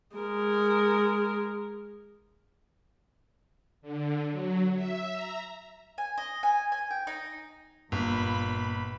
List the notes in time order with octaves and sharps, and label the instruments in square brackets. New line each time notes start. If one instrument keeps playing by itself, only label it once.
[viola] G#3 A#4
[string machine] D3
F#3
E5
A#5
[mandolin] G#5
D#5
G#5
G#5
G5
D#4
[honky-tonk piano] G1 [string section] A#2 B5